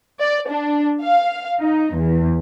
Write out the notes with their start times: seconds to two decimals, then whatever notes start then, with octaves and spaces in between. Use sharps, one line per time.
0.20 D5
0.48 D4
1.02 F5
1.60 D#4
1.94 E2